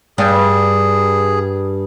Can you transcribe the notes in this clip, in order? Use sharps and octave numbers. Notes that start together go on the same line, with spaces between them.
G2 G#4